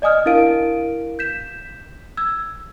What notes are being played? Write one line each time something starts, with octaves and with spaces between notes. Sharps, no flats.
D5 D#5 G#5 D#6 F6
D4 E4 A#4 F5 D7 D#7
G6 B6 E7
E6 G#6